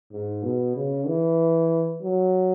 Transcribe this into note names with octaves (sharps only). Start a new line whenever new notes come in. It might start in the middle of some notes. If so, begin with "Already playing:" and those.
G#2
B2
C#3
E3
F#3